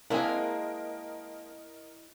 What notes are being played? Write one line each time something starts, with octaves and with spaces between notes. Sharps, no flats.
G#3 A#3 C4 D4 E4 G#4 A#4 D#5